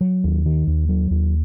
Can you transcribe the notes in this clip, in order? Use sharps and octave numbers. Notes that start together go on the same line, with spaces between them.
F#3
D#2
D#3
D#2
F#3
D#2